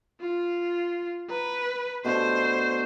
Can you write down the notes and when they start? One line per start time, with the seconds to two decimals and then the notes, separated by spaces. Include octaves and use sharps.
0.21 F4
1.30 B4 A#5
2.05 B2 A3 D4 C5